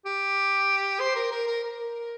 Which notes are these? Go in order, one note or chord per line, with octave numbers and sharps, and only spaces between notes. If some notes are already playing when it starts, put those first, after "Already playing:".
G4
C5
A#4
A#4
A#4
A#4